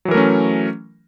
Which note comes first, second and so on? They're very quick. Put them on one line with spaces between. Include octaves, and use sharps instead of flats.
F#3 E3 A#4 A3 C#4